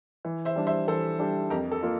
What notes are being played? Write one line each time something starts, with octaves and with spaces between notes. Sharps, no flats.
E3
C5 E5
G3 D4 G4
C5 E5
E3 A4 C5
G3 D4 G4
F2 G4 A#4
A4
A#3 F4